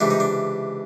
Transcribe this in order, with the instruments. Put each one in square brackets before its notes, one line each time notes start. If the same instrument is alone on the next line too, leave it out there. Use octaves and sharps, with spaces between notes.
[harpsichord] C#2 C3 E3 D4
D#4
D4